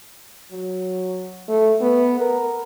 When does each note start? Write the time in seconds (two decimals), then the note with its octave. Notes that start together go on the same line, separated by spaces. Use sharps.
0.52 F#3
1.49 A3
1.81 B3
2.20 A#4